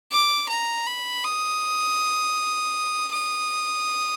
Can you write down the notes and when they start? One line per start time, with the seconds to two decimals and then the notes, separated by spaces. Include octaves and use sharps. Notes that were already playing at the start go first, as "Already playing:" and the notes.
0.11 D6
0.49 A#5
0.87 B5
1.24 D#6
3.12 D#6